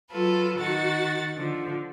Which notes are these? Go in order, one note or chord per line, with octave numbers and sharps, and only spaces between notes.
F#3 F4 A4 B4
D#3 F#4 F#5 A6
D3 F3